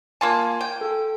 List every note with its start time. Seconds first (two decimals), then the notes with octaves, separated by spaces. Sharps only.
0.21 A#3 F4 G#5 A5
0.61 G5
0.81 A4